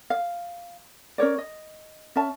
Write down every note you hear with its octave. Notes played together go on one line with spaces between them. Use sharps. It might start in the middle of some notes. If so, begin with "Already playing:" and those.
F5
C#4 A#4 C#5 D5
D#5
C#4 E5 A5